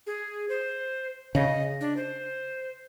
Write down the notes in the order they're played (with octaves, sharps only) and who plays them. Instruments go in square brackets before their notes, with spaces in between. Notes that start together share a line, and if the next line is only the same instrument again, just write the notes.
[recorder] G#4
C5
[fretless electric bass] C#3 [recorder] D#5
[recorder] D4
C5